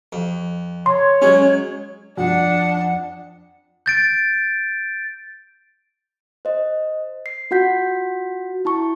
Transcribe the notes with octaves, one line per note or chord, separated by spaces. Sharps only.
F2
C#5 C6
F#3 G#3 C#4
F2 D4 F#5
G6 A6 D7
C5 D#5
C7
F4 F#4 F#5 G6 B6
E4 A5 C#6